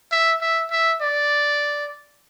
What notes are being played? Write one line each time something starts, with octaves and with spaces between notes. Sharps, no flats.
E5
E5
E5
D5